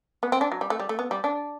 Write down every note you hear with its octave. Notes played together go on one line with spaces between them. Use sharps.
B3
C4
D4
F#3
G3
A3
G3
A3
B3
G3
D4